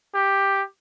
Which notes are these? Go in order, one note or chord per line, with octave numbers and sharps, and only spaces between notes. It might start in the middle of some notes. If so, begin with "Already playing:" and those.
G4